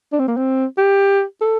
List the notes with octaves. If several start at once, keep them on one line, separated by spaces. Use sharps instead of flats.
D4
C4
A#3
C4
G4
A4